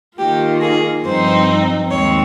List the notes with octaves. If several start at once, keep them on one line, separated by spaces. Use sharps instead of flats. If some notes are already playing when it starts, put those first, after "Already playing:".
D#3 A#3 F4 G4
G#4
G2 F3 C4 D#4 C5
D#2 D#3 G#3 C4 C#5